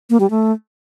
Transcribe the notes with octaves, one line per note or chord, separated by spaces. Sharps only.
A#3
G3
A3